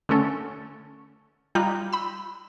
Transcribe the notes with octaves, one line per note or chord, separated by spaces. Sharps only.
D3 A3 C#4 A4
G3 D#4 F4 F#6
B5 E6